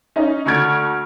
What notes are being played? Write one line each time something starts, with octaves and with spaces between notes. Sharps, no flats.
C#4 D#4
D2 C#6 F6 G#6 D7